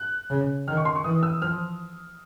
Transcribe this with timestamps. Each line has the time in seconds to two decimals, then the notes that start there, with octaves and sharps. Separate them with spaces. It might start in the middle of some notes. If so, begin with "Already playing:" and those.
Already playing: F#6
0.30 C#3
0.68 D#3 F6
0.77 C#6
0.85 C6
0.95 C#6
1.04 E3 D#6
1.23 E6
1.41 F3 F6